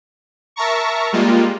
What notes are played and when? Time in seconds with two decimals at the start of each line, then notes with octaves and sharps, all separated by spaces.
0.56 A#4 E5 A5 A#5 C#6
1.13 G3 G#3 A#3 F4